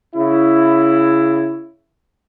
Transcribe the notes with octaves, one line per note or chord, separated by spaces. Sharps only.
C#3 E4